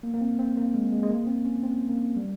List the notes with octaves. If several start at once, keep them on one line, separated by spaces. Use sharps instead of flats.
A#3
A#3
C4
C4
A#3
G#3
G#3
G#3
A#3
C4
C#4
C4
A#3
G3